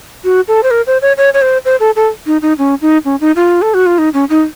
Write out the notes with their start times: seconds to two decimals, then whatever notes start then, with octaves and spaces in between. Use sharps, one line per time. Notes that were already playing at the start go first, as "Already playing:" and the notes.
0.24 F#4
0.48 A4
0.63 C5
0.71 A#4
0.87 C5
1.02 C#5
1.17 C#5
1.34 C#5
1.42 C5
1.65 C5
1.80 A4
1.96 A4
2.26 D#4
2.42 D#4
2.58 C#4
2.81 D#4
3.05 C#4
3.21 D#4
3.36 F4
3.62 A4
3.74 F#4
3.86 F4
3.98 D#4
4.14 C#4
4.30 D#4